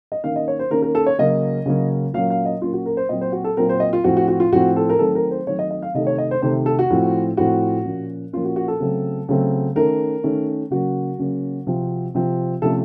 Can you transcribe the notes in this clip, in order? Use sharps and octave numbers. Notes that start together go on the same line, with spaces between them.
D#5
D#3 A#3 C#4 F5
D#5
C#5
C5
D#3 A#3 C#4 A#4
A#4
A4
C#5
C#3 F#3 A#3 C#4 D#5
C#3 F#3 A#3 C#4
A#2 F#3 A#3 C#4 F5
F5
D#5
A#2 F#3 A#3 C#4 F4
F#4
A#4
C5
A#2 F#3 C4 D#5
C5
F#4
A4
A#2 F#3 C4 A#4
C5
D#5
F4
A2 F3 C4 F#4
F#4
F#4
F4
A2 F3 C4 F#4
A4
A#4
D#3 F#3 A3 C4 A4
A#4
C5
D#3 F#3 A3 C4 C#5
D#5
D#5
F5
C3 D#3 A3 D#5
C#5
D#5
C5
C3 D#3 A3 C5
A4
F#4
A2 F3 C4
A2 F3 C4 F#4
A#2 F3 A#3 C#4
A#2 F3 A#3 C#4 F4
F#4
F#4
A4
C#3 F#3 A3 C4
C#3 F#3 A3 C4
D#3 A3 C#4 A#4
D#3 A3 C#4
C#3 F#3 A#3 C#4 F#4
C#3 F#3 A#3 C#4
C3 F3 C4
C3 F3 C4
C3 F3 A3 C#4 A4